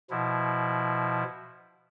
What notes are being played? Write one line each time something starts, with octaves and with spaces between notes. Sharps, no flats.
B2 F3 E4